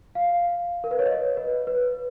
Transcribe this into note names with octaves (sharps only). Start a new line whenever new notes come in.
F5
A#4
B4
C#5
D#5
B4
B4